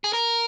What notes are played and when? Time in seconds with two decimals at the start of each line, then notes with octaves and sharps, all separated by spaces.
0.04 G#4
0.13 A#4